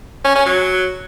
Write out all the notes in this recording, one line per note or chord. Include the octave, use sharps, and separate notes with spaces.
C#4
C#4
F#3